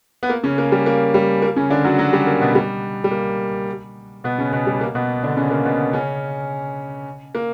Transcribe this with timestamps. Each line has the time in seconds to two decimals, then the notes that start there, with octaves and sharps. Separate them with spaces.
0.23 B3
0.29 A#3
0.44 C#3 C#4
0.58 A#3
0.72 G3
0.86 A#3
1.14 G3
1.42 A#3
1.56 C#3 C#4
1.70 D3 D4
1.85 F#3 F#4
1.99 F#3 F#4
2.13 G3
2.27 A#3
2.41 B2 B3
2.55 G3
3.04 G3
3.11 A#3
4.24 B2 B3
4.39 C#3 C#4
4.53 B2 B3
4.67 G3
4.81 A#3
4.95 B2 B3
5.23 D3 D4
5.37 C#3 C#4
5.51 A#3
5.65 B2 B3
5.93 C#3 C#4
7.35 A#3